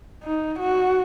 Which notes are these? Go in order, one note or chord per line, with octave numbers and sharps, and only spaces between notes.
D#4
F#4